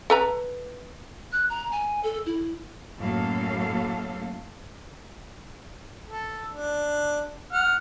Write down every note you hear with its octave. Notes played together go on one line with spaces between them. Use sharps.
A4 B4 A#5
F#6
A#5
G#5
A4
E4
F#2 A2 F#3 A#3 A4 F5
A4
D4
F#5 F6